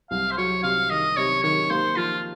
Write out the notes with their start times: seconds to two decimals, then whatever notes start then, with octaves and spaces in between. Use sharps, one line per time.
0.11 C2 F5
0.31 C5
0.38 F#3 C#5
0.63 C3 F5
0.90 D#3 D#5
1.17 C3 C#5
1.44 D#3 C#5
1.70 A#3 C5
1.97 F3 F4